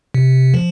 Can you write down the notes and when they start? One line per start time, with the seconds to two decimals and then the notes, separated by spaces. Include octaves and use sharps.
0.14 C3
0.54 F3